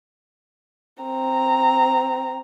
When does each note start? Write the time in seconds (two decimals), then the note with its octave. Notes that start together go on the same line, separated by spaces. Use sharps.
1.03 C4 A#5